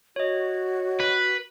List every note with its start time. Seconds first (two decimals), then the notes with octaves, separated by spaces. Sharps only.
0.16 F#4 C#5 D#5
1.01 B4